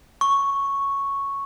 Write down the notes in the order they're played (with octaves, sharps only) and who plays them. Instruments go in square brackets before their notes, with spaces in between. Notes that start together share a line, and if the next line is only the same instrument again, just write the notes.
[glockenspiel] C#6